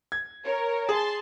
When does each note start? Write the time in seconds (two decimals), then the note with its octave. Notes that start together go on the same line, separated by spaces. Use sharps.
0.12 G#6
0.44 A#4 C#5
0.89 G#4 A5 C6